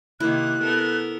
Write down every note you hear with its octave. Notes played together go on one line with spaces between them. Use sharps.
C3 D#3 A#3 E4 F#6
B3 A4 A#4